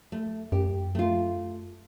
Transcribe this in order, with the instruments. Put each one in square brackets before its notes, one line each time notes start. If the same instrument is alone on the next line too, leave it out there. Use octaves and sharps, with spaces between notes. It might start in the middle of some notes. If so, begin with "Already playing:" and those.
[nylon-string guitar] A3
[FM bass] F#2 [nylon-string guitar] G4
[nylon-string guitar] A3 F4